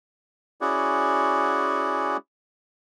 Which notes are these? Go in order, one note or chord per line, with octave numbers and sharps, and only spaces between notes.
C#4 E4 F#4 G#4 D5 F#5